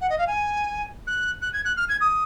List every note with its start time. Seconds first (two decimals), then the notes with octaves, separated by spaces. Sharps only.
0.01 F#5
0.09 D#5
0.18 F5
0.27 G#5
1.07 F#6
1.41 F#6
1.53 G#6
1.65 F#6
1.77 F6
1.89 G#6
2.01 D#6